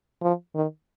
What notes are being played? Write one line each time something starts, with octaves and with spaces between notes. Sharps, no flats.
F3
D#3